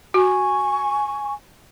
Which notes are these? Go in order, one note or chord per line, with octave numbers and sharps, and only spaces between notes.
F#4 G#5 C#6